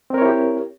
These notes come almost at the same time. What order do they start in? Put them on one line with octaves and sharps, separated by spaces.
C4 A#4 C#5 E4 G4